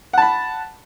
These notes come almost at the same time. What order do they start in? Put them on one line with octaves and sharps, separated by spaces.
F#5 A5 B5